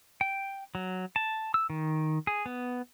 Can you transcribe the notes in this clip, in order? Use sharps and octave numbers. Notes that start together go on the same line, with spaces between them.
G5
F#3
A5
E6
D#3
G#4
B3